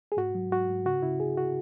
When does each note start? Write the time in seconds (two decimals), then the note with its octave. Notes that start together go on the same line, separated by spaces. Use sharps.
0.12 G#4
0.17 G#2 F#4
0.35 F#3
0.51 G#2 F#4
0.69 G#2
0.85 C#3 F#4
1.02 C#3 E4
1.20 C#3 G#4
1.38 F#4